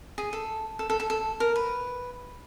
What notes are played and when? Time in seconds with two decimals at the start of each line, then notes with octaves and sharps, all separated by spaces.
0.18 G#4
0.33 A4
0.79 A4
0.90 A4
1.00 A4
1.10 A4
1.40 A#4
1.56 B4